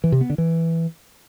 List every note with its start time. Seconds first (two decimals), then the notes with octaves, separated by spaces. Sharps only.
0.04 E3
0.12 C3
0.21 B3
0.30 D3
0.38 E3